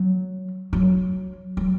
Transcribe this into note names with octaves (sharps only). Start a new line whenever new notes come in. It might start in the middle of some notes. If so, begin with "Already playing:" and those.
Already playing: F#3
F#3
F#3